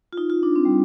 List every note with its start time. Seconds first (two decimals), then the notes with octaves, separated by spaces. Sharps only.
0.13 F4
0.18 D#4
0.30 F4
0.43 D4
0.56 C4
0.65 G3